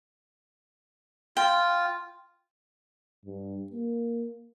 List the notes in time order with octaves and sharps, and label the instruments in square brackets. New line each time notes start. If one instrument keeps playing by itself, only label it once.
[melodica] F4 [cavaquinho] G5
[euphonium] G2
A#3